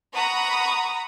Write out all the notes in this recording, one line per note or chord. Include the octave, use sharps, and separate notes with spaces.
F#5 A#5 B5 C#6 D#6